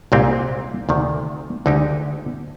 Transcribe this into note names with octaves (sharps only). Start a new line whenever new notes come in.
C2 A#2 G#3 C4 G4
D2 C3 D#3
D2 D3 G#3 D#4 G4